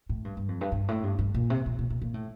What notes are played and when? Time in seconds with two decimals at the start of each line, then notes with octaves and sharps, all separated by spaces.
0.09 A2
0.25 G2
0.37 G2
0.49 F2
0.61 G2
0.72 G2
0.88 A2
1.04 G2
1.19 G2
1.34 A#2
1.50 C3
1.66 A#2
1.79 A#2
1.90 A#2
2.02 A#2
2.14 A2